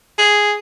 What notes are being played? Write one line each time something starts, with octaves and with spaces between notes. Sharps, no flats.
G#4